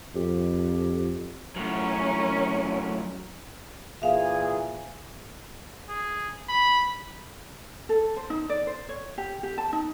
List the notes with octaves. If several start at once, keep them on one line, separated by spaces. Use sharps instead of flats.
F2 G4
F#2 A2 C#4 A#4
A#2 E3 G#4 E5 F5
G#4
B5
A4
C5
D#4
D5
C5
C#5
G4
G4
A5
D#4